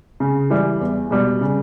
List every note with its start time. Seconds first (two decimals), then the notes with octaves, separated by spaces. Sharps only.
0.20 C#3
0.50 E3 G3
0.81 E2
1.11 B2 G3
1.41 C#3